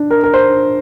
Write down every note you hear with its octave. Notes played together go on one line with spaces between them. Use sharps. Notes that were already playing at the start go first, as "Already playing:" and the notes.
Already playing: D4
A#4
A#4
C5